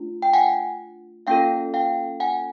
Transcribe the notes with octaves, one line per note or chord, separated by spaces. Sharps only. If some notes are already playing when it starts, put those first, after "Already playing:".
Already playing: A3 D4 F4
G5
F#5 G#5
A#3 C#4 F4 A4 F5 G5
F5 G5
F#5 G#5